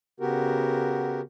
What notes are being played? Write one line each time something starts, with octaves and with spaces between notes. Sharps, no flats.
C#3 B3 F#4 G4 A#4